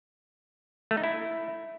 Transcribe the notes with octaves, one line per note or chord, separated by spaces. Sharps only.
A3
D#4
E4